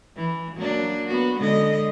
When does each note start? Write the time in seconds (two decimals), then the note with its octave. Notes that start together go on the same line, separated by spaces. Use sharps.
0.16 E3
0.57 F#3 A#3 D4
1.07 B3 F#4
1.39 D3 G#3 D#5